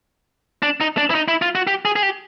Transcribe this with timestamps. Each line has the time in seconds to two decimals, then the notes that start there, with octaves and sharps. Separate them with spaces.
0.63 D4
0.81 D#4
0.97 D4
1.10 E4
1.15 D#4
1.28 E4
1.42 F4
1.55 F#4
1.67 G4
1.85 G#4
1.96 G#4
2.03 G4